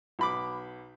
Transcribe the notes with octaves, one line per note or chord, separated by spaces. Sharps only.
B1 B5 D6